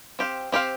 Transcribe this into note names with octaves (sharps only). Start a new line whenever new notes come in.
C4 G4 C5 F5
C4 G4 C5 F5